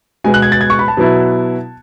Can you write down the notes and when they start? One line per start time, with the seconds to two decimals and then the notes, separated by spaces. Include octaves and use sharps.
0.24 B2 G#3 B3 G#5
0.34 F#6
0.42 G#6
0.52 A6
0.61 G#6
0.70 C#6
0.79 B5
0.88 A5
0.97 B2 F#3 B3 E4